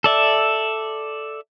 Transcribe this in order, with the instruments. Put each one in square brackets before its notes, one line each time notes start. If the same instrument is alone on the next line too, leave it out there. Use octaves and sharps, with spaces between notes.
[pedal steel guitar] A4 D5 E5